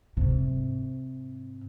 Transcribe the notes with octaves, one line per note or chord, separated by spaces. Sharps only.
G#2 C3